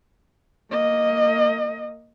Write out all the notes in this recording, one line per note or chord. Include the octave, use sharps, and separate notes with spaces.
A#3 D#5